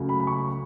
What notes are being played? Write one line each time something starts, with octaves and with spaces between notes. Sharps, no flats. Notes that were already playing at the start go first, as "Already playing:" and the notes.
Already playing: C#2 C#3 F#3 A3
B5
B5
C#6